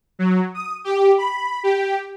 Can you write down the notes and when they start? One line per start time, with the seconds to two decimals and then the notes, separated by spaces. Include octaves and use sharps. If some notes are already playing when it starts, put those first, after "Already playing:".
0.19 F#3
0.54 D#6
0.84 G4
1.18 B5
1.63 G4